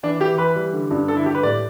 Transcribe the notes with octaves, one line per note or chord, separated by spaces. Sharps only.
E3 D4
E3 G4
E3 B4
G3
D3
G2
D3 A4
E4
G3 G4
B4
A2 D5